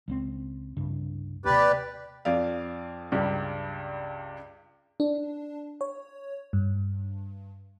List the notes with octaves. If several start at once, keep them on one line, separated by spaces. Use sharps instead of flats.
C#2 G3 C4
C2 G2 C#3
D#2 C3 G4 B4 D5
F2 D5 F5
C#2 G2 G3
D4
C#5
G2